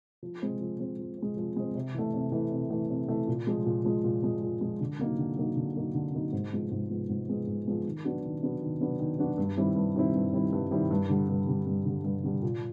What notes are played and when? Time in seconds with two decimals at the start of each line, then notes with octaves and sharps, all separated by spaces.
0.23 F3
0.42 G#3 C4
0.61 F3
0.80 G#3 C4
0.99 F3
1.18 G#3 C4
1.37 F3
1.56 G#3 C4
1.75 C3
1.94 E3 A3
2.14 C3
2.32 E3 A3
2.52 C3
2.70 E3 A3
2.90 C3
3.08 E3 A3
3.27 A#2
3.47 F3 G#3
3.66 A#2
3.85 F3 G#3
4.04 A#2
4.23 F3 G#3
4.42 A#2
4.61 F3 G#3
4.81 D3
4.99 F#3 A#3 D#4
5.18 D3
5.37 F#3 A#3 D#4
5.56 D3
5.76 F#3 A#3 D#4
5.95 D3
6.13 F#3 A#3 D#4
6.33 G#2
6.52 F3 G#3 B3
6.71 G#2
6.90 F3 G#3 B3
7.09 G#2
7.28 F3 G#3 B3
7.47 G#2
7.66 F3 G#3 B3
7.85 D#3
8.04 F#3 B3 D4 F#4
8.23 D#3
8.43 F#3 B3 D4 F#4
8.61 D#3
8.81 F#3 B3 D4 F#4
8.99 D#3
9.19 F#3 B3 D4 F#4
9.38 G2
9.57 D#3 G3 C4 E4
9.76 G2
9.96 D#3 G3 C4 E4
10.14 G2
10.33 D#3 G3 C4 E4
10.53 G2
10.71 D#3 G3 C4 E4
10.91 G2
11.09 D3 G3
11.28 G2
11.47 D3 G3
11.66 G2
11.85 D3 G3
12.04 G2
12.24 D3 G3
12.42 A#2